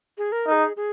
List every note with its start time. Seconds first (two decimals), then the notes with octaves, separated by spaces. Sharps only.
0.18 G#4
0.32 A#4
0.47 D#4 A#4
0.52 G#4
0.77 G#4